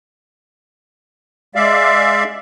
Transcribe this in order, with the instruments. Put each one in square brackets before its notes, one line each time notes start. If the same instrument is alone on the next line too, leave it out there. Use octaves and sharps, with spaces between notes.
[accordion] G#3 D5 E5 F5